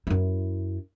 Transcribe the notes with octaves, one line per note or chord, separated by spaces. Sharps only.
F#2 E4